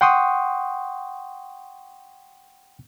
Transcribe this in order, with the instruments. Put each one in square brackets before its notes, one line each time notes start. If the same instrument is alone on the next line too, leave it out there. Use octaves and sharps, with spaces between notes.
[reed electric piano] F#5 G5 C6 C#6 D#6